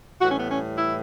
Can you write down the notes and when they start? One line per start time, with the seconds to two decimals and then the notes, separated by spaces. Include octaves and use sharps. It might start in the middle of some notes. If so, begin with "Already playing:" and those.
0.21 A2 E3 G3 F#4
0.30 C#4
0.40 B3
0.49 C#4
0.77 E4